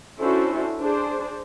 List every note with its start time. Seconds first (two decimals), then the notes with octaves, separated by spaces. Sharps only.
0.20 C#4 D4 E4 F#4 A4 C5
0.79 D4 G#4 C5 D5